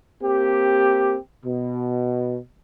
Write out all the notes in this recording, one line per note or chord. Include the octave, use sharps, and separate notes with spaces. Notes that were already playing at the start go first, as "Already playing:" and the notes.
A#3 C4 G4
B2